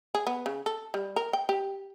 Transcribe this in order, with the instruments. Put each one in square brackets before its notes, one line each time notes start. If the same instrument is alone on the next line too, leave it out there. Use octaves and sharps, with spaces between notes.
[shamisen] G#4
B3
C#3
A4
G3
A#4
G5
G4